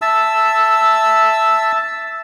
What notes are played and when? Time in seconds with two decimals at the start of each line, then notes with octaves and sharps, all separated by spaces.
0.02 E5 A5 E6